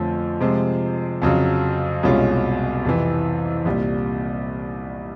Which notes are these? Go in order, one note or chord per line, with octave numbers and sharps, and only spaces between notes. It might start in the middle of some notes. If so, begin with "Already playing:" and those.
Already playing: F2 D3 F3 A3 C#4
C3 F3 G#3 C4
F2 C#3 F#3
C2 B2 G#3 C#4 F4
F2 C3 E3
C2 A#2 G3